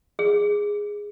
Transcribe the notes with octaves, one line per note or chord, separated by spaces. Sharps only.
G#4